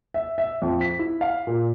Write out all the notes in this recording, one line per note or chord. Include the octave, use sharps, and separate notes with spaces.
E5
E5
F2
B6
E4
F5
A#2